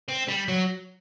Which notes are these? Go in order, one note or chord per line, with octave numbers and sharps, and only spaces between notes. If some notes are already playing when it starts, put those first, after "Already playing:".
C4
G3
F#3